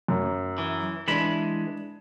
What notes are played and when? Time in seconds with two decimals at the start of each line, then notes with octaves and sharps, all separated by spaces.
0.08 F#2
0.58 E3
1.08 E3 G#3 D4 B5 E7